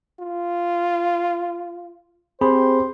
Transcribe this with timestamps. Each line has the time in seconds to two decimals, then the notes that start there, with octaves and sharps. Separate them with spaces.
0.20 F4
2.41 C4 G4 G#4 C5 B5